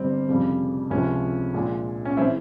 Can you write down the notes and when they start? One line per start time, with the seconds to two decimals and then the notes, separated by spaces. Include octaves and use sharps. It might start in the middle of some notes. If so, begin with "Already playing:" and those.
Already playing: G1 G2 G3 C4
0.28 F1 F2 C#3 G3
0.90 C#2 C3 F3 G#3 C#4
1.54 A#1 A#2 G#3
2.05 C#4
2.17 E3 G#3 C4 E4